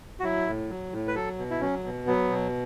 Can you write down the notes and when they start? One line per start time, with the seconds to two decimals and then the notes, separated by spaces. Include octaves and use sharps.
0.20 F#4
0.23 F#3 E4
0.47 A2
0.69 F#3
0.93 A2
1.07 B4
1.15 F#3 A4
1.38 B2
1.50 E4
1.61 F#3 C#4
1.84 B2
2.07 F#3 B3
2.30 B2